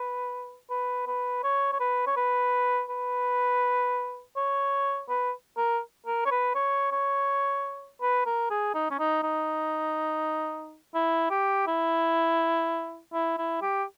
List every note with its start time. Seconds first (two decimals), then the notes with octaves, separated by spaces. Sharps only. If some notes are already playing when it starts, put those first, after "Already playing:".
Already playing: B4
0.70 B4
1.07 B4
1.43 C#5
1.73 C#5
1.80 B4
2.07 C#5
2.17 B4
2.90 B4
4.36 C#5
5.09 B4
5.57 A#4
6.06 A#4
6.25 C#5
6.31 B4
6.55 C#5
6.92 C#5
8.01 B4
8.26 A#4
8.50 G#4
8.74 D#4
8.91 C#4
8.99 D#4
9.23 D#4
10.95 E4
11.30 G4
11.67 E4
13.13 E4
13.38 E4
13.62 G4